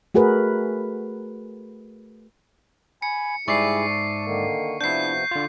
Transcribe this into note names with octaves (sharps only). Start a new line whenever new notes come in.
A3 F#4 G#4 A#4 B4
G#5 B5 C#7
G#2 G3 E4 G#4 D5 E5 C#6 C7
A5
D3 D#3 A#3
C3 F3 B3 D4 E4 G6 C7
D3 F4